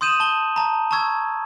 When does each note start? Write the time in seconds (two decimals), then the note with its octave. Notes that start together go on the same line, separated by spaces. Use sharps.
0.01 C6 D#6 G6 D#7 E7 F#7
0.20 A5 G7
0.56 A5 A#5
0.91 A5 A#5 C#6 E6 G#6